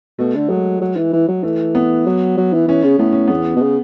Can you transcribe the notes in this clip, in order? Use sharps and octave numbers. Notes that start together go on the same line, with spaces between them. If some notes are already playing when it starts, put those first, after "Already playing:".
B2 A3
D3
F#3 G#3
F#3
E3
E3
F#3
E3 A3
B3
F#3
F#3
E3
E3 C#4
C#3
A2 B3
C#4
E2 B3
B2
C#3